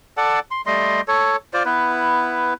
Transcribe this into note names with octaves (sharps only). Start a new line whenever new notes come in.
A4 D5 F#5 A5
C6
G3 A3 D#5 C6
A4 C#5
F4 C5 D5
B3 E4 B4